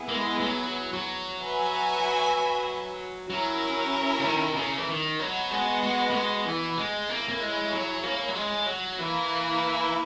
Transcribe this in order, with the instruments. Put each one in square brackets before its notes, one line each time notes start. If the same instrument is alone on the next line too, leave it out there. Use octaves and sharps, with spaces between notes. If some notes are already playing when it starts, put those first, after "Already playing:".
Already playing: [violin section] B3 E4 G#4
[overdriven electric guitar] A#3
G#3
G#3
F#3
F#3
[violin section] F#4 B4 E5 G#5
[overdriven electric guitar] F#3 [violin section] C#4 E4 A#4
[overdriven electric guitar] C#3
D#3
B2
C#3
E3
D#3
[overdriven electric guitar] F#3 [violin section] B3 F#4 B4 D#5 F#5
[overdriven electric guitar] G#3
G#3
A#3
G#3
E3
G#3
[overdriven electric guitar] A#3 [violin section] E4 G#4 C#5
[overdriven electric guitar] A#3
G#3
F#3
A#3
F#3
G#3
F#3
[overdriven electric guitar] E3 [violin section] A#3 E4 B4